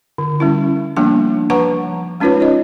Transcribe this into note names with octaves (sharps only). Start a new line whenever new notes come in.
D3
G3 C#4 E4
F3 G3 A#3 B3 D4 A5
F3 B4 F#5 A5 A#5 C#6
G#3 C#4 D#4 F4 B4 C#5
C#5 D#5